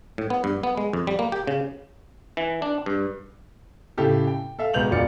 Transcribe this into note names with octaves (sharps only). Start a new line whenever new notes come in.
A2
B3
G2
B3
G#3
F2
G3
A#3
G4
C#3
E3
D4
G2
A2 C#3 E4 G4 A4
G5
A4 E5 F5
B1 G#3 B3 G6 F7 F#7
E1 B2 F4 D5 C#7